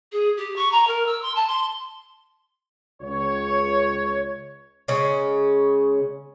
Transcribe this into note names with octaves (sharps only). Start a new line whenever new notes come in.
G#4
G4
C#6
A#5
A#4
E6
C6
A5
C6
C#2 C#5
C#3 G#3 C#4